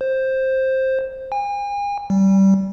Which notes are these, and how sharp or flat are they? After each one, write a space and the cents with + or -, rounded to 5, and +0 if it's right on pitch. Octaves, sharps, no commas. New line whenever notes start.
C5 +10
G#5 -40
G3 -20